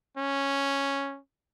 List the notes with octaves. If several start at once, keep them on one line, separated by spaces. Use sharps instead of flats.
C#4